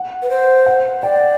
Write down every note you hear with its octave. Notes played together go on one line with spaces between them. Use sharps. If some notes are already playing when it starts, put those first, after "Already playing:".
Already playing: F#5
B4
C5
F#5
D5 G5